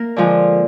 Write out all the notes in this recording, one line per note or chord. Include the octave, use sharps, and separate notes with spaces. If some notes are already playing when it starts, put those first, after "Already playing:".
Already playing: A#3 A#4
D3 F3 G#3